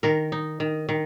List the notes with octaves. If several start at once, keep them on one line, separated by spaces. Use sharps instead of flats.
D#3 A#4
D#4
D#3
D#3